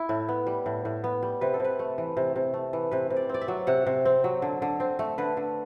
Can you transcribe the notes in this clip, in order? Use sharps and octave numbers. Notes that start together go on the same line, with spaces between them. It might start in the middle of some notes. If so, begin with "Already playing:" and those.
Already playing: E4
A2
B3
G3
A2
A2
B3
G3
C3 B4
A4
C3 B4
A3
E3
C3
C3
A3
E3
C3 B4
C3
D5
C4 D5
E5
F#3
C3 F#5
C3
C4
F#3
D3
D3
C4
A3
D3 B4
D3